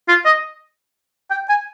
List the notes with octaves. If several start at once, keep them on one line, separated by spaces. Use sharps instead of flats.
F4
D#5
G5
G#5